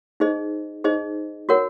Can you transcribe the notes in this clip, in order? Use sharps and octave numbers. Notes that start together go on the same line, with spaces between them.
D#4 G#4 C5 D#5
D#4 G#4 C5 D#5
F#4 A#4 C#5 F#5